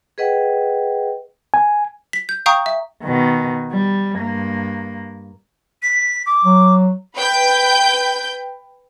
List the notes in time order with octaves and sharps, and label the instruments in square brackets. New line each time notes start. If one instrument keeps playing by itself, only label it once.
[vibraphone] G#4 B4 D#5 F#5 G5
[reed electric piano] G#5
[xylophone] B6
G6
F5 G5 A#5 C#6 D#6 G6
E5
[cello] B2 D#3
G3
G2 A#3
[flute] B6
D6
[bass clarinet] F#3
[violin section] B4 G5 G6